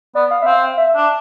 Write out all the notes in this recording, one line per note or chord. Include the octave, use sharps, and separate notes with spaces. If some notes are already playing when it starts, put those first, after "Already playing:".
B3 D5
F5
E5
C4 F5
E5
D4